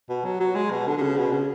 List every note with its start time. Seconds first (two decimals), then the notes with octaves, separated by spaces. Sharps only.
0.09 B2
0.24 F#3
0.40 F#3
0.55 G#3
0.71 B2
0.87 D3
0.97 D3
1.02 C#3
1.18 B2
1.32 C#3